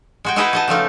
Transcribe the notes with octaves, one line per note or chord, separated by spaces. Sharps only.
G#3 F#4 G5
D#4 E4 F#4 G#4 B4 D#5
F#4 D#5 A5
C#3 F3 A3 D#4